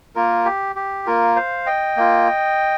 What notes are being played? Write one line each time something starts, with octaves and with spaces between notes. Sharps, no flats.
A#3 F4 A#4
G4
G4
A#3 F4 A#4
C5 F5
D#5 G5
A#3 F4